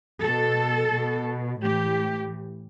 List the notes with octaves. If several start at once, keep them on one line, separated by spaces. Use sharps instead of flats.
B2 A4
B2
A2 E3 G4